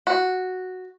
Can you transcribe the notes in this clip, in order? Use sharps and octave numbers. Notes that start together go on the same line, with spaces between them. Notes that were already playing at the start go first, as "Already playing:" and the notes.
F#4